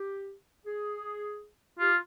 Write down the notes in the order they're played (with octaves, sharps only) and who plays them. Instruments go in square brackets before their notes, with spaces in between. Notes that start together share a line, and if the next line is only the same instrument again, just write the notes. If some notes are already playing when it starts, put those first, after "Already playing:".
Already playing: [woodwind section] G4
G#4
[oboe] F4 [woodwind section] G4